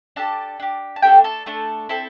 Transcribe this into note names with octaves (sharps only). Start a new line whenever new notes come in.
D4 G4 A4 A5
D4 G4
A5
A3 D4 G4 A4 G5
A4 A5
A3 D4 A4
C4 E4 A4